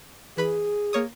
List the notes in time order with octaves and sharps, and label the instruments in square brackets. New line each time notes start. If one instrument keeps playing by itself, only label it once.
[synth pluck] E3 B4 B5 [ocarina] G#4
[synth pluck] A#3 C#5 D#6